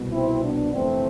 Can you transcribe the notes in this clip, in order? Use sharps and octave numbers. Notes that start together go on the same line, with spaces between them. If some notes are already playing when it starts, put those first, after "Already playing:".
Already playing: C2 B2
C4 E4
B3 D4
G1 F2 C3 E3 A3 C4